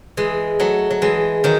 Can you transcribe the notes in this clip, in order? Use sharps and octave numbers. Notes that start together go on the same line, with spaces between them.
E3 G#3
F#3 A3
F#3
E3 G#3
D#3 F#3